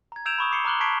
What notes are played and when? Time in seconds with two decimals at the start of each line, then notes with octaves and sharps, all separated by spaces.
0.12 A#5 G#6
0.26 E6 G6 G#6 D7 E7 F7
0.38 B5 C#6 D#6
0.51 D6 D#6 C7 C#7 G7
0.65 A#5 D6 F6 F#6 F#7 G7
0.80 A5 C#6 G#6 B6 C7 D7